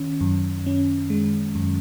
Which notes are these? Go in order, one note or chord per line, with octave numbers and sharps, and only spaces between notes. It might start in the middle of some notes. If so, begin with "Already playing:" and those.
Already playing: D#3 C#4
F#2
C#4
G#3
F#2